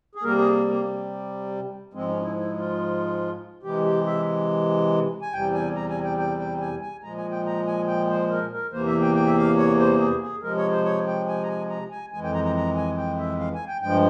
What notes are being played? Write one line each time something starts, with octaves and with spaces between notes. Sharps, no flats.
G#4
C3 G3 A#3 A#4
G#4
A#3
G#2 F3 G#3 C4
C#4
E4
E4
F4
C3 E3 G#3 G4
G4
E5
G#5
E2 C3 G3 G5
G#5
A#5
G#5
G5
G5
G5
G#5
G#5
A#2 F3 G#3 A#5
G#5
G5
A#5
G#5
G5
C5
A#4
A#4
E2 C3 E3 A#3 C5
E5
G5
G5
E5
F5
C#5
C5
G#4
G#4
C3 F3 G#3 A#4
C#5
C5
C#5
G5
G#5
A#5
G#5
A#5
G#5
F2 E3 G#3 G#5
G5
A#5
A#5
A#5
G#5
G5
E5
F5
G#5
G5
G2 F3 G#3 G5